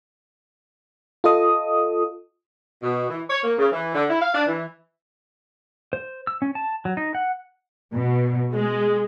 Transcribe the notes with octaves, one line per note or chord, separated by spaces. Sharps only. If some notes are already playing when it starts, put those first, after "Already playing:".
F4 A4 D#5 D#6
B2
E3
C#5
A#3
C#3
E3
D3
E4
F5
D4
E3
C5
E6
C#4
A5
F#3
D#4
F#5
B2
G#3